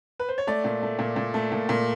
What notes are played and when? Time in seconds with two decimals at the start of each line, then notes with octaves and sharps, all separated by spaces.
0.20 B4
0.29 C5
0.38 C#5
0.47 A3 D5
0.64 A#2
0.82 A3
0.99 A#2
1.16 A#2
1.34 A3
1.52 A#2
1.69 A#2